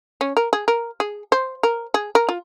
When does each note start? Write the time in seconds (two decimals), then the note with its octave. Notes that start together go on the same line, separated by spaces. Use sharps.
0.21 C#4
0.37 A#4
0.53 G#4
0.68 A#4
1.00 G#4
1.32 C5
1.63 A#4
1.94 G#4
2.15 A#4
2.29 F4